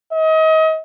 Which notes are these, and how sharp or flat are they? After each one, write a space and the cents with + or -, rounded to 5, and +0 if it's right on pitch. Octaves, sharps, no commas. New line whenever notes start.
D#5 +35